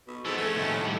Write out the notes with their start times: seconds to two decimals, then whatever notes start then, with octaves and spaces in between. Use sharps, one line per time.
0.07 B2
0.25 G#2 E3 B3 A4
0.38 F2 A3 C#4
0.56 D#2 A2
0.85 G3